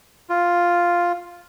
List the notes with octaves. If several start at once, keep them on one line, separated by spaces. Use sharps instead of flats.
F4